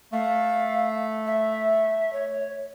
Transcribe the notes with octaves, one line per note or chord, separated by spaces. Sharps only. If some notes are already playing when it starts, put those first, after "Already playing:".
A3 F5
E5
C#5